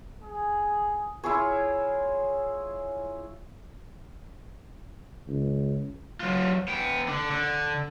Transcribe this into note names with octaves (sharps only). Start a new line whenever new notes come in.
G#4
E4 F4 G#4 C#5
C#2
F#3 F4
B3 G5
D3
D3